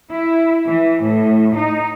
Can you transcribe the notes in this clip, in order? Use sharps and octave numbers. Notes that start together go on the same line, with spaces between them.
E4
E3
A2
D#4